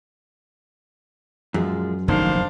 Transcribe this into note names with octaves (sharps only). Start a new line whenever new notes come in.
F#2 A#2 F3 G#3
F1 A#1 A2 D#3 D4 C5 F5